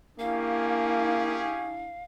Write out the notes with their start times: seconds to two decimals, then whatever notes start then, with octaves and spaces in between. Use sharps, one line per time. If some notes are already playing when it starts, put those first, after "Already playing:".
0.19 A#3 C#4 D4 E4 G4 G#4 F5